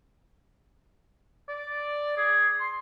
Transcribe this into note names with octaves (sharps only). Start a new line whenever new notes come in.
D5
G#4
C6